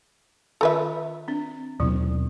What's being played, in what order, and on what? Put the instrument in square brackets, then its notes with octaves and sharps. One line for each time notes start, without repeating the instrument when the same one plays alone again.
[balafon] D#3 F4 [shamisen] A4 B4 E5
[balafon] C4 D4
[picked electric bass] D#2 B2 C4 [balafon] F#3 E4